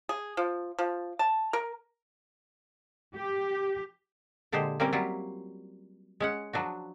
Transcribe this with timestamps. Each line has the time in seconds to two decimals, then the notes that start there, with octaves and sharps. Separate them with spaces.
0.09 G#4
0.37 F3
0.78 F3
1.19 A5
1.53 A#4
3.16 G4
4.52 A#2 D3 G#3 G4 C5
4.80 G3 A#3 C4 C#4 A#4
4.93 F#3 G3 E4 F4
6.20 G#3 C#4 F#5
6.53 F3 F#3 D4 F#4